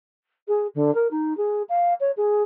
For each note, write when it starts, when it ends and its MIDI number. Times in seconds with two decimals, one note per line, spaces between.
0.48 0.67 68
0.74 0.93 50
0.95 1.07 70
1.11 1.36 63
1.37 1.62 68
1.69 1.94 77
2.00 2.11 73
2.17 2.43 68